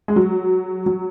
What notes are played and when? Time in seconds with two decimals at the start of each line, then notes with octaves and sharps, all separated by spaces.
0.08 G#3
0.16 F#3
0.86 F#3